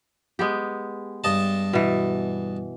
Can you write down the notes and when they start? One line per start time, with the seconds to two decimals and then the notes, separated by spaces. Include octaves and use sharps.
0.39 G#3 B3 G4
1.24 G2 D#5 A5
1.73 B2 E3